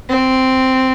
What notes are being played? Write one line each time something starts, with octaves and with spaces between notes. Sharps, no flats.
C4